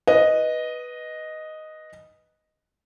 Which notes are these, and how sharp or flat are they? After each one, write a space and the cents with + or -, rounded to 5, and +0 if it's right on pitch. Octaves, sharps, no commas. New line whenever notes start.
B4 -5 D#5 +0